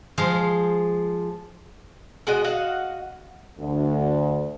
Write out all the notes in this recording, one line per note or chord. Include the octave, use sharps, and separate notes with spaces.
F3 G#3 F5
G#3 F#4 D#5
F#4 D#5 F5 F#5
D2